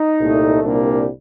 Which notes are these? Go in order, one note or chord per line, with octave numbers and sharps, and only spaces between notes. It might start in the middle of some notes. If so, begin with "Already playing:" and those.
Already playing: D#4
C2 A#2 A3
C2 A#2 G3 A#3 D4